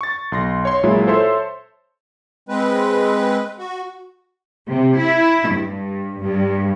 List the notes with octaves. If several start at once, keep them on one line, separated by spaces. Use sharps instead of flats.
C#6 A6
B1 C6 A#6
C#5 C6
A#2 F#3 G#3 E4 F4
A4 C5 C#5 E5 C6
G#3 C4 B4
F#4
C3
E4
G2
G2